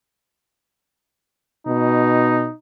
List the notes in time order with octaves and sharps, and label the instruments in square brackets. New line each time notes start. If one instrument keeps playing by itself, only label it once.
[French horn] B2 [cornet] D#4